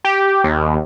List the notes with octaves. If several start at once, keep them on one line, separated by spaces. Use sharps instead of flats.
G4
D#2